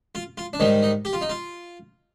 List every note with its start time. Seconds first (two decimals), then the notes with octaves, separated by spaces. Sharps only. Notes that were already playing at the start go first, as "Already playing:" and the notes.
0.15 F4
0.38 F4
0.53 D4
0.60 G#2 D#3 G3 D#4
0.83 D#4
1.05 G4
1.13 F4
1.21 D#4
1.29 F4